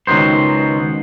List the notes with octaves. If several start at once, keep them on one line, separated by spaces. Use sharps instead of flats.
C#2 D#3 F#3 B3 C5